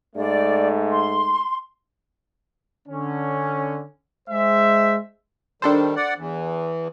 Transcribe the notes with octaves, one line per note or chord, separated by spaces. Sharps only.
G#2 A3 D5
C6
D3 C#4
G#3 C5 E5
D#3 G3 D4 A4 C5
D5 F#5
E2 E3